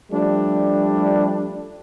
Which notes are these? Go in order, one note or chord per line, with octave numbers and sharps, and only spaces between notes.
F3 G3 A3 D4